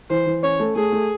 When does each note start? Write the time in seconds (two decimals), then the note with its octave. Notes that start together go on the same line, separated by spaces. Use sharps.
0.10 E3 C5
0.26 E3
0.43 C#4 C#5
0.60 A3
0.76 A3 G#4
0.92 A3